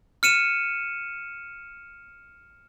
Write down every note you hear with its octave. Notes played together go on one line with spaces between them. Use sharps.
F6 C#7 D#7 E7